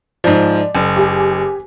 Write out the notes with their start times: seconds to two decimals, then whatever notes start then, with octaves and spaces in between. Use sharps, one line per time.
0.24 G#2 F3 D5
0.75 F#1
0.97 G4 G#5